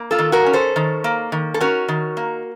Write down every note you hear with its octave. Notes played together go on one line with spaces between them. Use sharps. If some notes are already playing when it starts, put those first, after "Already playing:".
Already playing: A#3
F4 A4
D#3
F#4 A#4
C#4
A4 C5
D#3
A#3
D#3
A4
C#4 F#4 A#4
D#3
A#3